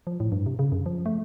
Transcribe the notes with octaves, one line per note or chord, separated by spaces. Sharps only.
F3
A2
G2
C3
C#3
F#2
F3
A3